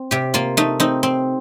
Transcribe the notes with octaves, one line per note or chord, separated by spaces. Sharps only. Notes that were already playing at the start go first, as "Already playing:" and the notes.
Already playing: C4
C3 G4
A#3 F4
A3 D#4
C4 D#4
C4